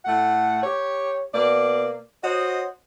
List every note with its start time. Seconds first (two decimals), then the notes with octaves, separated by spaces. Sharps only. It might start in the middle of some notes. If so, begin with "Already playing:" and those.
0.05 A2 A3 F#5
0.63 G4 C#5
1.33 B2 A#3 B4 D5
2.23 F#4 C5 C#5 D#5